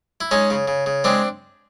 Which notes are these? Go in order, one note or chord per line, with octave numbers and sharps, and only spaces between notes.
E4
G#3 C#4 D#4
C#3
C#3
C#3
G#3 C4 D4